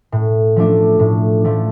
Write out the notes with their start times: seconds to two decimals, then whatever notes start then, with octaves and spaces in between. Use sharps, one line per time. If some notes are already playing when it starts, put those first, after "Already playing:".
0.12 A2
0.56 F3 A3 D4
0.99 A2
1.44 F3 A3 D4